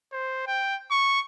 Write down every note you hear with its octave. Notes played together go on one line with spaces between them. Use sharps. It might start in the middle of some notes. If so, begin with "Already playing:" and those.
C5
G5
C#6